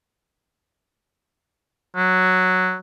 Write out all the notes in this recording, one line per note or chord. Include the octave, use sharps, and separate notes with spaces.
F#3